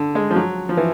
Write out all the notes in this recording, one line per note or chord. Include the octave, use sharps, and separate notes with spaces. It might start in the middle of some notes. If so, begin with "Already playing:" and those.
Already playing: D3
G#3
F3
F#3
F3
E3